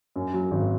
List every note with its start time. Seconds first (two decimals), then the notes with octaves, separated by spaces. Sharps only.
0.16 F#2
0.34 F#3
0.51 G#1